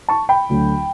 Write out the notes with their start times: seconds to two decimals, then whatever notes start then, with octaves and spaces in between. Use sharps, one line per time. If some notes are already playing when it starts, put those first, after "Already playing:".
0.08 A5 C#6
0.29 G5 B5
0.49 D2 D3 F#3